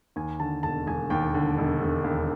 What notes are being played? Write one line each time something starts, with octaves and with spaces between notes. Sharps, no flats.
D#2 G#5
D3 A5
E1 A5
E1 G#5
D#2 G5
D3
E1
E1
D#2